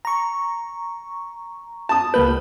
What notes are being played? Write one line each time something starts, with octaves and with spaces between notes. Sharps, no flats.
A#5 C#6
A5 D#6
C#2 A#3 B4 G6